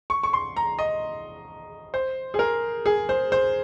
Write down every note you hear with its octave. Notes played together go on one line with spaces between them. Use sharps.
C#6
C#6
C6
A#5
D#5
C5
G#4
A#4
G#4
C5
C5